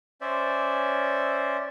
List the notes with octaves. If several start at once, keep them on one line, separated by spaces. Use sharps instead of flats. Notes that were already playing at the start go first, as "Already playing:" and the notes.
C#4 C5 D5 E5